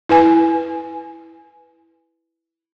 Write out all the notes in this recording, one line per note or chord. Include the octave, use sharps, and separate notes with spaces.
E4 B4 G#5